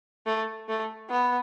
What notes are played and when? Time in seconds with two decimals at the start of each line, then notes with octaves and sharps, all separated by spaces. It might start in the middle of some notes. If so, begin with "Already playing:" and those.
0.26 A3
0.69 A3
1.10 B3